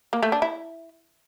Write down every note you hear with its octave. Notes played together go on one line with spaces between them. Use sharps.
A#3
A3
D4
E4